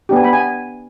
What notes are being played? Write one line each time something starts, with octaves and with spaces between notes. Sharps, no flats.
B3 D4 G4
G#5
B3 B5
G#5